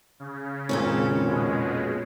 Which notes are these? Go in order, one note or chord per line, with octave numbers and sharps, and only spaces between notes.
C#3
G#1 F2 A#2 C#4 A4
B2 G#3